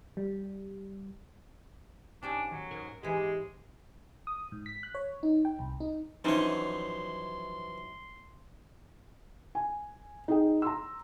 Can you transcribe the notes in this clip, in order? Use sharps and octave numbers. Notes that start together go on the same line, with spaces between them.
G3
G#2 C#4 D4 G4 G5
D#3 F#3
G#2 A#4
G#2 E3 G#3 G4 E5
D#6
G#2
B6
F#6
C#5
D#4
G5
C2
D#4
F#2 E3 F3 D#4 C#5 C6
G#5
D#4 G#4 G5
A#5 C6 E6